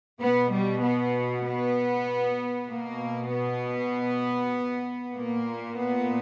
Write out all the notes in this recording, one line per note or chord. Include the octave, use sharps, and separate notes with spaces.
B2 B3
G3
B3
B3
B2 A#3
B3
A#2 A#3
B3